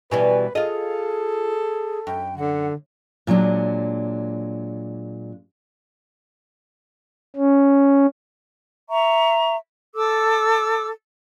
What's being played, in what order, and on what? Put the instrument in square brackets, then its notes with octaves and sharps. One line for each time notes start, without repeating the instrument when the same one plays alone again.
[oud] B2 E3 G3 [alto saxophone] B4 [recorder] G#5
[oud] F4 D#5 [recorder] G#4 [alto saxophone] A4
[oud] F#2 [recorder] G5
[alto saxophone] D3 [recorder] F#5
[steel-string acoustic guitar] A#2 F#3 G#3 D4
[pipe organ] C#4
[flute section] E5 A#5 C#6
A4 D6 E6